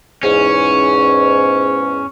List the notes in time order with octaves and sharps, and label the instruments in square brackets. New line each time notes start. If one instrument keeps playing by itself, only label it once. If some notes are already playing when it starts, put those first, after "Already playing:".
[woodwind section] E2 G#2 [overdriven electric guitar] C#4